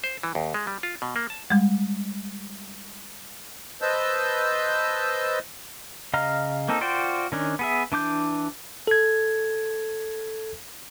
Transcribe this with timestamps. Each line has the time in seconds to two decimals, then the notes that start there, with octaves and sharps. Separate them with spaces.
0.04 C5
0.23 E3
0.35 D#2
0.54 G#3
0.67 G3
0.83 F4
1.02 B2
1.16 A#3
1.30 A5
1.50 G3 G#3
3.82 B4 C5 D#5 A5 E6 G6
6.13 C#3 D#5 F5 A#5 F6
6.68 A#3 C4 D#4 A4
6.81 F4 F#4 C5 D5 G5
7.32 D#3 C#4 D4
7.59 B3 G#4 E5
7.92 E3 D4 D6 G6
8.87 A4 G#6